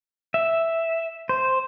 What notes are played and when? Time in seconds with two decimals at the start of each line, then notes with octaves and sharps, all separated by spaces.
0.34 E5
1.29 C5